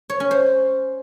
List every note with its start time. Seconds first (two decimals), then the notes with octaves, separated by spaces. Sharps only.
0.10 C#5
0.20 C#4
0.31 C5